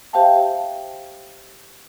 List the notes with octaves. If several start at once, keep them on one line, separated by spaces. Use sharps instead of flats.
G4 C5 E5 F5 G5 A5